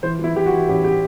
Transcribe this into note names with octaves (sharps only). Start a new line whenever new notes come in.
E3 C5
E3 E4
E3 G4
F#4
E3
A1 G4
G4